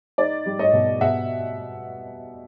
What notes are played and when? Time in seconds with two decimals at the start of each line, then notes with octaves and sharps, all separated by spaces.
0.18 D#4 D5
0.46 G3
0.59 C#5 D#5
0.73 B2
1.01 B2 E5 F#5